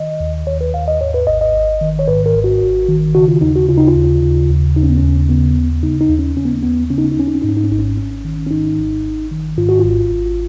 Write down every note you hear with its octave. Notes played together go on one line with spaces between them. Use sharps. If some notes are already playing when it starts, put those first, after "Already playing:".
Already playing: D#3 D#5
D#2
D#3 C#5
B4
D#2 F5
D#5
G#2 C#5
B4
G#1 D#5
D#5
G#1
D#3
C#5
G#2 B4
A#4
G#1
F#4
G#1
D#3
C#3 F#4
F4
D#2 D#4
F#4
C#3 F4
D#4
F4
D#2
C#3
D#2
C#3 D#4
C#4
B3
C#4
D#2
C#3 B3
D#2
C#3 D#4
D#4
D#2
C#4
C#3 C#4
B3
A#3
D#2 B3
C#3 C#4
D#4
C#4
D#4
D#2 C#4
D#4
C#4
G#2 D#4
C#4
D#4
C#4
G#1 D#4
C#4
G#1 C#4
D#3
C#4
G#2 D#4
G#1
G#1
D#3
G#2 F4
F#4
F4
G#1
G#1